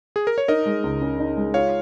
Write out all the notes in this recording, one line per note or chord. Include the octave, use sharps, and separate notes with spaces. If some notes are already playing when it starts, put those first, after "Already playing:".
G#4
A#4
C#5
D#4 A#4 D#5
G#3
C#2
C#3
D#4
G#3
F4 C#5 F5